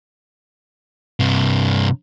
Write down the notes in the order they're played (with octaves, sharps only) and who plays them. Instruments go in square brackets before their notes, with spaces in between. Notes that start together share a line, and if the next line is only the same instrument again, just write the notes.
[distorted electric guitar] G2 C3